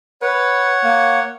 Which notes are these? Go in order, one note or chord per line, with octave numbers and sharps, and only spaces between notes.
B4 C#5 F#5
A#3